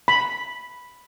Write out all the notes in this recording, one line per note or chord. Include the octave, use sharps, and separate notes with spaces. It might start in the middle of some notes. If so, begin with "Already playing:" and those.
B5